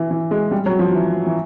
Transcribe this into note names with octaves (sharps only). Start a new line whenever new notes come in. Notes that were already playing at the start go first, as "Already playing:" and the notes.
Already playing: E3
E3
G#3
G3
F#3
F3
E3
E3